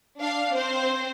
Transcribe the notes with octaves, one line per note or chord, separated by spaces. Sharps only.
D4 F5
C4 C5